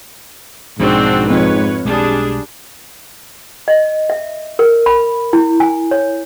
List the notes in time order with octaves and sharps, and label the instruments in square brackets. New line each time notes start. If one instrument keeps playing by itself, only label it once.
[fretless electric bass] B1 F3 [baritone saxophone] G#2 [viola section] C4 D4 F#4
[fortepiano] F2 [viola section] B4 C#5
[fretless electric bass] B1 G#3 [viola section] G3 D4 G#4
[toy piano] D#5
E5
A#4
B5
E4
G#5
C#5